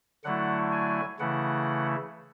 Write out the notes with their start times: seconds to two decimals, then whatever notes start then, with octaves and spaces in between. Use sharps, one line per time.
0.24 D3 F#3 A3 E4 F#5
0.72 G#5
1.19 C#3 E3 A3 E4 F#5